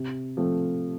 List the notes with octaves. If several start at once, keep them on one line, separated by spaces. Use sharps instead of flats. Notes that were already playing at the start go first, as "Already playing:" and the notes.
Already playing: C3
F3 A3 C4